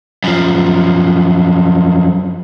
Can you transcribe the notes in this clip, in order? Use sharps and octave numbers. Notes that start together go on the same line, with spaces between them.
F#2 F3